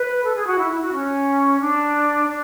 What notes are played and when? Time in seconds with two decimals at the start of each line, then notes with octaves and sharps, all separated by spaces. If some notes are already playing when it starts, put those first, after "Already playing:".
Already playing: B4
0.23 A4
0.34 G#4
0.46 F#4
0.57 E4
0.69 E4
0.81 F#4
0.92 C#4
1.60 D4
2.27 D4